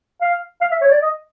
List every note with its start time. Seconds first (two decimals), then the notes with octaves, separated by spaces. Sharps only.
0.21 F5
0.61 F5
0.71 E5
0.81 C#5
0.91 D5
1.02 D#5